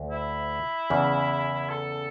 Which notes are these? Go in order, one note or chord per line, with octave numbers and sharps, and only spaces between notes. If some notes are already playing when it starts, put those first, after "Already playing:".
Already playing: D2
E4
E2 C#3 E3
A4